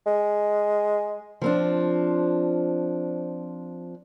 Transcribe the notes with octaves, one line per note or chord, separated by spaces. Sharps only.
G#3
F3 C4 D4